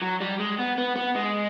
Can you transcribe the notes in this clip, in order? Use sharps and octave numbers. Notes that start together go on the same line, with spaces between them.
F#3
G3
G#3
B3
B3
B3
G#3